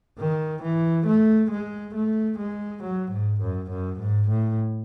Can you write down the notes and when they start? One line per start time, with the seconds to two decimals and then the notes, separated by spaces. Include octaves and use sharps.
0.19 D#3
0.62 E3
1.06 A3
1.51 G#3
1.95 A3
2.38 G#3
2.83 F#3
3.11 G#2
3.41 F#2
3.70 F#2
4.00 G#2
4.29 A2